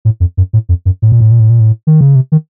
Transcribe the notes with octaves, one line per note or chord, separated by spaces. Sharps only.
A2
F2
F#2
A2
F2
F#2
A2
A#2
A2
A#2
A2
A#2
A2
D#3
C#3
C3
D#3